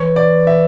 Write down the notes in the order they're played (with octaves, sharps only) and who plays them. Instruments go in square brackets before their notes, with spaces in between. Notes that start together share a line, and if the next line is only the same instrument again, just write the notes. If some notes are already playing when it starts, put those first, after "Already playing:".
Already playing: [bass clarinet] E3 [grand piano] C#5
[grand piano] D5
E5